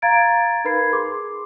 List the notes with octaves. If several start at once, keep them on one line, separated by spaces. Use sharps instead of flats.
F5 A#5 G#6 A6 D7
D#4 A#4 B4 B5 G#6 C7
G#4 C6 D6